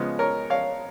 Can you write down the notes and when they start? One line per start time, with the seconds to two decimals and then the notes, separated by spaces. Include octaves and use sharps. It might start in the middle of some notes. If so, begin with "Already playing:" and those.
Already playing: C#3 F3 G#3 B3
0.19 A#4 C#5
0.50 C#5 F5